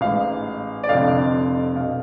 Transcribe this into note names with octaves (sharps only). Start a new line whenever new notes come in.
A1 G#2 F5
D5
F1 F2 D3 F5
B1 B2 F5